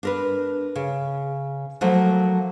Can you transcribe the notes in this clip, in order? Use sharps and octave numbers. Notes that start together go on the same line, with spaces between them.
D4 A#4 B4
C#3
F3 F#3 A3 A#3